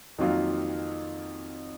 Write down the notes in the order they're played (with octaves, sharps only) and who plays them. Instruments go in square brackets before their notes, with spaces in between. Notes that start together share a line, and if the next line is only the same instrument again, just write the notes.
[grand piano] F2 D#3 F#3 A#3 F4